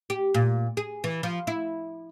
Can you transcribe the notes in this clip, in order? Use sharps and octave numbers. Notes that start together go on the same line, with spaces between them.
G4
A#2
G#4
E3
F3
E4